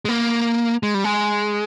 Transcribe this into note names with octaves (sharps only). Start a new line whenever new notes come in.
G#3
A#3
G#3
G3
G#3